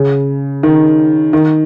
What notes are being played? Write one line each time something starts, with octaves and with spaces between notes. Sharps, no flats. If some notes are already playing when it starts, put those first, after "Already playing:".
Already playing: C#3
D#3
D#3